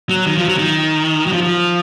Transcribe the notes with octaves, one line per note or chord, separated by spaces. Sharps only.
F#3
D#3
F3
F#3
D#3
F#3
F3
F3